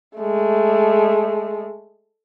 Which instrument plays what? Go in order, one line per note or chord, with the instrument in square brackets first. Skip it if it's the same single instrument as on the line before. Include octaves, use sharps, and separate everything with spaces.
[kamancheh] G#3 A3